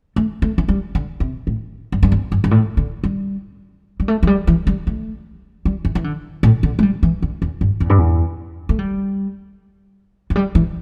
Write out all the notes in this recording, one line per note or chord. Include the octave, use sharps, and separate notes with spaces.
A3
A3
E3
G3
D3
C3
A2
G2
G2
E2
G2
G2
A2
D3
G3
G3
A3
E3
G3
E3
G3
A3
G3
E3
E3
D3
A2
D3
A3
G3
E3
D3
E2
G2
E2
G2
E2
A3
G3
E3
G3
E3